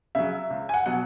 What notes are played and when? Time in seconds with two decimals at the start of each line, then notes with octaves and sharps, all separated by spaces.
0.15 C#3 F#3 E5
0.50 C#2
0.69 G#5
0.74 F#5
0.86 B2 F#3 F#5